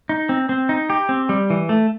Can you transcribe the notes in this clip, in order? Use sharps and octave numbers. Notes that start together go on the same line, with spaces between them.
D#4
C4
C4
D#4
G4
C4
G3
E3
A3